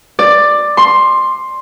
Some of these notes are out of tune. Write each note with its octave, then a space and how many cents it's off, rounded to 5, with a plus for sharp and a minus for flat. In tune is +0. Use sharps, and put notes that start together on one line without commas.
D5 +10
C6 +10